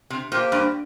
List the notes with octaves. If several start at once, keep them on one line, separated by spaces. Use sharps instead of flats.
C3
A#2 A#3 G4 C5 G5
G2